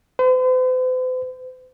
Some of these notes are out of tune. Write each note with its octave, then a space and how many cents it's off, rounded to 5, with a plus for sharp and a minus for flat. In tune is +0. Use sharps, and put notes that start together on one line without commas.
C5 -45